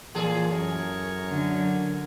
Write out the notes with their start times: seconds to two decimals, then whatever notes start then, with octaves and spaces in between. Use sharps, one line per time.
0.15 A#2 E3 G#4 A4
0.50 F#2 A#4 C#5
1.29 D3 F#3